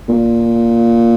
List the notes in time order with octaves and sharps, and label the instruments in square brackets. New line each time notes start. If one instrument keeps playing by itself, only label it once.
[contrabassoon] A#2